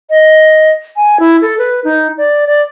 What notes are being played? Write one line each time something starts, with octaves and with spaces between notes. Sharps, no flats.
D#5
G#5
E4
A4
B4
D#4
D5
D5